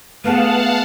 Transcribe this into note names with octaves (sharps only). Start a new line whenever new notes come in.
A3 B3 G#4 B4 F5 F#5 A5